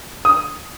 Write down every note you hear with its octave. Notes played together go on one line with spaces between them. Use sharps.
D#6